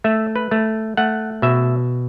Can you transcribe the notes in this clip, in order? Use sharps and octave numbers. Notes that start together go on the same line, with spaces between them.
A3 E5
B4
A3
A3 F#5
B2 E5